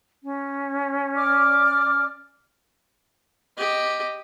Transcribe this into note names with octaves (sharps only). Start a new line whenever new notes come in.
C#4
D5 D6 F6
G4 D#5